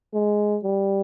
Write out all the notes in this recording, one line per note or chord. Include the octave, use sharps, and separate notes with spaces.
G#3
G3